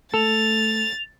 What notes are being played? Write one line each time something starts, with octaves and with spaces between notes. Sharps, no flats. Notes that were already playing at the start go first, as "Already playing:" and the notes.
A3 A4 A6 F7